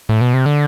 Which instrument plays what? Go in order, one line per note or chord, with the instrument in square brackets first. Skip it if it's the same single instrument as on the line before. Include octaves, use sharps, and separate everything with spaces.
[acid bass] A2
B2
C3
D3